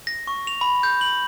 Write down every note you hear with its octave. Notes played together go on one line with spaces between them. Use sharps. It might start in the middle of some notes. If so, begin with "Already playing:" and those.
A#6
C#6
F7
B5
G6
F#7